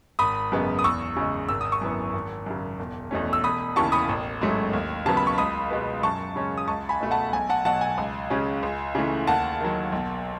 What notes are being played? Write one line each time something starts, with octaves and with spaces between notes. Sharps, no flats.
G#1 B5 D#6
F#2 C#3 G#3 B3
D#6
E2 C#6 E6
C#3 G#3
G#1 E6
D#6
C#6 E6
F#2 E3 B3
G#1
F#2 C#3
E1
E2 B2 A3 C#4
E6
E1 B5 D#6
D#2 C#3 E3 A5 C#6
B5 D#6
A1
G#2 F#3 A3 C#4
D#2
C#3 F#3 B3 A5
B5
C#6
C#2 B5 D#6
B2 G#3 B3
F#2 A5 C#6
C#3 G#3 C#4
D#6
C#2 A5 C#6
G#5 B5
B2 A3
F#5 A5
B1 G#5
F#5 A5
B2 F#3 F#5 A5
G#5
C#2
C#3 G#3 C#4
C#2
C#3 E3 A3
D#2 F#5 A5
D#3 F#3
B1